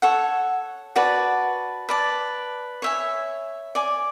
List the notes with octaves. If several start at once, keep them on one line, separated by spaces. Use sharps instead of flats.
A4 C#5 F#5
F#4 B4 D5 A5
B4 D5 A5
C#5 E5 G#5
D5 G#5 D6